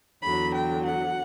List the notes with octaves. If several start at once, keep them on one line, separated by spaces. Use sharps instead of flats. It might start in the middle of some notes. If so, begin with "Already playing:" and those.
E2 D3 F#3 B5
G5
F#5